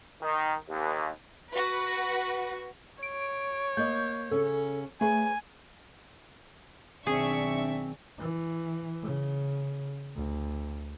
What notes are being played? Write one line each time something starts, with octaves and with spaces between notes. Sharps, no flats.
D#3
D#2
F#4 B4
C#5 D7
A#3 D#5 G6
C#3 C#4 A4
A3 G#4 B4 C#5 G#5
B1 D#3 C4 D4 G#4 E5 C#6
E3
C#3
D2